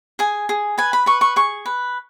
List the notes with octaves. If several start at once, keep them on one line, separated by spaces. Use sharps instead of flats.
G#4 G#5
G#4
B4 G#5
B5
B4 C#6
C#6
G#4 C#6
B4